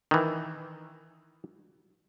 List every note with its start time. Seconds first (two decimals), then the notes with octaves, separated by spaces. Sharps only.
0.11 D#3 E3